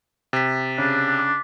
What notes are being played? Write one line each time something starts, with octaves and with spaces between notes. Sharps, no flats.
C3 A6 B6
C#3 D4
D6